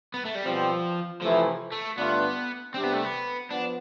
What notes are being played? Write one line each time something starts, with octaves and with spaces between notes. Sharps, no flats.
B3
A3
G3
B2 F3 G3 C4
C3 E3 F3 A3 E4 B4
A3
G2 D3 A3 B3 D4 F4
C3 G3 C4 D4 G4
B3
A3
B3
F3 B3 D4